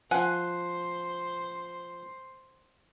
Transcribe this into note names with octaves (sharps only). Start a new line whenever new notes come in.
F3 C5 F#5 G#5 F#6